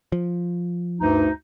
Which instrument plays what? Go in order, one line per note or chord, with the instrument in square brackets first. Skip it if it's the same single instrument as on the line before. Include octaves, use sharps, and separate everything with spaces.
[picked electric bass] F3
[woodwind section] D2 G2 D#4